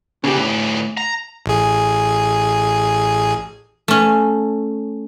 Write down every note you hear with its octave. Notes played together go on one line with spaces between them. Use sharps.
D2 C#3 E3 G4
A2
A#5
A1 G#4
A3 C#4